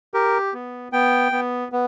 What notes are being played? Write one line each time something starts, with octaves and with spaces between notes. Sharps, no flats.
G4 A#4
B3
B3 G5
B3
B3